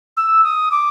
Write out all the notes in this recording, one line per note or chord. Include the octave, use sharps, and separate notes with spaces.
E6
D#6
D6